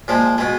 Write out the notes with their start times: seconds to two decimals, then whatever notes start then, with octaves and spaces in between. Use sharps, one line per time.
0.08 A#2 F3 G#3
0.38 B2 G#3